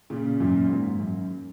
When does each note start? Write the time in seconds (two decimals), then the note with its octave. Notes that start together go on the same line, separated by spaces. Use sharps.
0.10 A#2 C#3
0.40 F#2 A#2
0.70 G#2
0.99 F#2